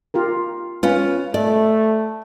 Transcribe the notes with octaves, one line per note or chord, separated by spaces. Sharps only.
F4 G4 A#4
C#4 F4 B4 G#5
A3 D5